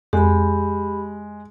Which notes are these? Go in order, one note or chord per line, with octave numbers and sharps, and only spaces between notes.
F2 G#3 G4 B5